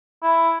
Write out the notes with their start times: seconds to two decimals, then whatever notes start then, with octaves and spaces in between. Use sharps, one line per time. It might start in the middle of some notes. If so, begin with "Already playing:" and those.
0.23 E4